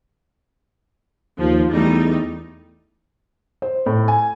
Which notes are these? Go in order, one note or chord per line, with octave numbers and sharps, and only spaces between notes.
D#2 F3
E2 G3 A3 D#4
C5
A2
G#5